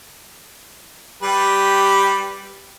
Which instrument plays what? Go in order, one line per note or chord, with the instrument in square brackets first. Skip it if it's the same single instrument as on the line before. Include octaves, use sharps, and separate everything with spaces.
[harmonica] G3 B4 [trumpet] G4